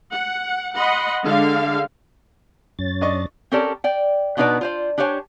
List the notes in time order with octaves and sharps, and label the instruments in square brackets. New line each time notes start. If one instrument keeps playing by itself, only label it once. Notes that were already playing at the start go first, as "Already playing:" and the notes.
[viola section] F#5
D#5 F#5 B5 C6
D3 G#3 F5
[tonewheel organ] F#2 C#4 A6
[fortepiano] D4 D#5 C#6
[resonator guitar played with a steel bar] C4 C#4 G4 A4 A#4 D5
D5 G5
B2 B3 D4 D#4 B4 D5
F4 C5 D5
D4 G4 C5 C#5 G5 G#5